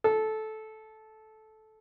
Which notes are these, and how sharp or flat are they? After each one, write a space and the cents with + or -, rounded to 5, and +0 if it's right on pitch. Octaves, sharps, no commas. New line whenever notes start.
A4 -15